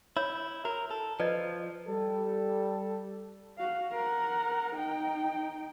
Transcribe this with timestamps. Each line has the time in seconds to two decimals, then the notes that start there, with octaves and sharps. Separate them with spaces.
0.17 E4 C#5
0.65 F#4 A#4
0.91 A4
1.20 F3 B4 D5 D#5
1.87 G3 A4
3.58 F#4 F5
3.92 A#4 F#5
4.76 D#4 G5